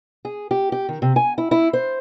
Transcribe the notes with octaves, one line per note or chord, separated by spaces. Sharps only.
G#4
G4
G4
D#3
C3
G#5
E4
E4
C5